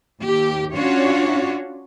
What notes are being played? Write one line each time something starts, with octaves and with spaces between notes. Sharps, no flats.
D#2 G4
C#4 D4 F4 F#4 C#5